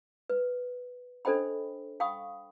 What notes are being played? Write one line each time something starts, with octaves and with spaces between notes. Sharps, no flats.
B4
D4 A4 C5 D#5 G5 B5
F5 G5 B5 C#6 D#6